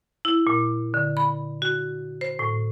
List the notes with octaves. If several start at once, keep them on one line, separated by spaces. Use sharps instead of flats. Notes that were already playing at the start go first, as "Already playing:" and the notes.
E4
A#2
D3
B5
F#4
C5
A2